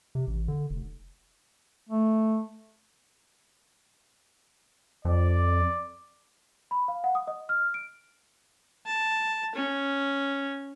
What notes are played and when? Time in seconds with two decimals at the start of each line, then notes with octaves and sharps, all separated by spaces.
0.15 C3
0.27 A1
0.48 D3
0.71 F1
1.89 A3
5.05 F2 D5
6.71 B5
6.88 F5
7.04 F#5
7.15 D#6
7.27 D#5
7.49 F6
7.74 D7
8.86 A5
9.55 C#4